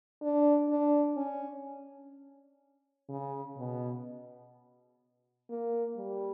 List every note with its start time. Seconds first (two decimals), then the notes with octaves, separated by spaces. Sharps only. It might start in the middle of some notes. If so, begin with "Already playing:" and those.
0.22 D4
0.69 D4
1.17 C#4
3.09 C#3
3.58 B2
5.50 A#3
5.97 G3